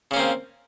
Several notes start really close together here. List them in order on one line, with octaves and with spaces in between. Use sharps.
C#3 C#4 A#3 C4